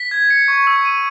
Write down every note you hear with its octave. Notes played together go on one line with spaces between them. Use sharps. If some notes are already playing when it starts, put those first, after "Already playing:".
Already playing: B6
G#6
C#7
C#6
E6
D#7